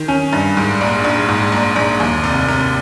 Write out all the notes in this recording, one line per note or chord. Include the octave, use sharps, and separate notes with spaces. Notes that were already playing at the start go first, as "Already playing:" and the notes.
Already playing: D#3
C#4
G2
G#2
A#1
A#1
G#2
A#1
A#1
D#2
F1
F1